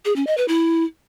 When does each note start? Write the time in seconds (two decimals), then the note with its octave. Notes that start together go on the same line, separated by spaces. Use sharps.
0.05 G#4
0.16 C#4
0.27 D#5
0.38 B4
0.48 E4